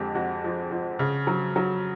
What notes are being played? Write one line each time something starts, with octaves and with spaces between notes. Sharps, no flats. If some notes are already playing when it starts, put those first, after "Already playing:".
Already playing: F2 D3 G#3 G4 G#4
F2 F#4
F3
F3
C#3
F#3
F#3